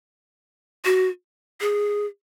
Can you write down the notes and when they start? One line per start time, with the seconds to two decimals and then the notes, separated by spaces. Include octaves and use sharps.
0.85 F#4
1.61 G#4